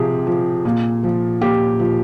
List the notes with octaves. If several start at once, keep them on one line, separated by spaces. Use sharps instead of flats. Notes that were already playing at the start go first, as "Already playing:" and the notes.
Already playing: C3 F3 G4 G#4
F3
A#2
F3
A#2 G4
F3